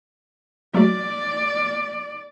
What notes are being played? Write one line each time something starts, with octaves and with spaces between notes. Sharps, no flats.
F#3 A3 F#4 D5